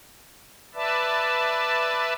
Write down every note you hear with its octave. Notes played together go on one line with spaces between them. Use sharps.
B4 D5 E5 A5